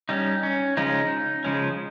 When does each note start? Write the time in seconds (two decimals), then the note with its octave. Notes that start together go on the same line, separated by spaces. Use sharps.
0.09 G3 C#4 D#4
0.43 C#4
0.77 C#3 F3 G#3 C#4 D#4
1.44 C#3 F3 G#3 C#4